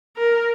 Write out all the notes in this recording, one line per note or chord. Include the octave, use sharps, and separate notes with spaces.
A#4